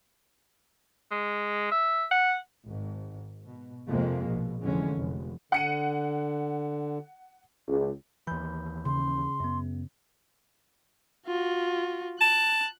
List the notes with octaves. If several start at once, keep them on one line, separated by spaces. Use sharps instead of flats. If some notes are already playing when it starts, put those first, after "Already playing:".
G#3
E5
F#5
G#1 G#2
B2
F2 C3 F3 G#3 A#3
A#1 B2
F1 F2 D3 E3 G#3 C#4
F1
D3 F#5 C#7 D#7
C#2
D#2 E3 B5 G6
C#3 C6
F#2 B3
F4 F#4
A5 F#6